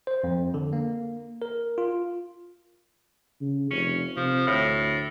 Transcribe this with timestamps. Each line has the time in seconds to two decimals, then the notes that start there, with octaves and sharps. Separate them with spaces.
0.07 C5
0.24 F2
0.54 D3
0.73 A#3
1.42 A#4
1.78 F4
3.41 C#3
3.71 F1 C#4
4.17 C3 F3
4.47 D2 A2